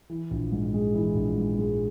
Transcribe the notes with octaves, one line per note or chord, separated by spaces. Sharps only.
E3
A#1
G#2
G#3
E3
A#1
G#2
G#3